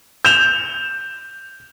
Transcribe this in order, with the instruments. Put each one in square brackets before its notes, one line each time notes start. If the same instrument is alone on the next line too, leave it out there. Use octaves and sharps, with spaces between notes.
[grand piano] G6 E7 F7